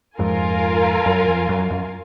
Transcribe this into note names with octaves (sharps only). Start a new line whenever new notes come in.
F2 G#2 F4 A#4 F5 G#5
F#2
F2
F#2
F#2